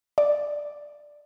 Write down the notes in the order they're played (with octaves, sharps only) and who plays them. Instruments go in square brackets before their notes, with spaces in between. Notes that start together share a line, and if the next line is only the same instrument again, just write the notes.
[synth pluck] D5